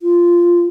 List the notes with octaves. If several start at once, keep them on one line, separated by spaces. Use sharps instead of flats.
F4